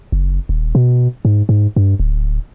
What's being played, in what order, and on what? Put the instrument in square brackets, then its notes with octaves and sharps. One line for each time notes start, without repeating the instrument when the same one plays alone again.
[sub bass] F#1
D#1
B2
G#2
G#2
G2
D1